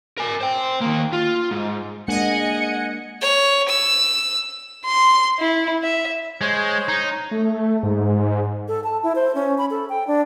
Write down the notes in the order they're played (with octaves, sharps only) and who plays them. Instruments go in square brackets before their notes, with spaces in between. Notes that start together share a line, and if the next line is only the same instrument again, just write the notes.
[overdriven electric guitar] A#4 G#5
C5 G5
D#2 A#3
F4
G#2
[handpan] G#3 A#3 D4 [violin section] D#5 C#7 [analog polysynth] F#5 G#5
[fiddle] C#5
E6
[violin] C6
E4
E5
[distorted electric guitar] G#3 [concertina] C5 C#5
[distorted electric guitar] D#4
[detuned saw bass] A3
G#2
[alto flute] A4
A5
E4
C5
C#4
B5
A4
G5
D4